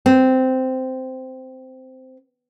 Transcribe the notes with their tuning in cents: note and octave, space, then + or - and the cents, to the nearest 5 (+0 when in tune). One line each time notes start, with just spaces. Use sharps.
C4 -10